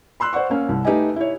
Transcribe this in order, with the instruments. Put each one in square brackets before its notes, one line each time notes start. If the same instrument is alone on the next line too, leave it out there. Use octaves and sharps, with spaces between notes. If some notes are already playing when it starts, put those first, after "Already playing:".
[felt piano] B5 C6 E6 F#6
C5 D5 F#5 C#6
A#3 C#4
C2
A3 D#4 G4 B4 D#5 G#5
E4 C#5